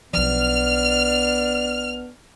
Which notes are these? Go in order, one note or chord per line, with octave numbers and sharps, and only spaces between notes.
B1 F3 B3 D4 F6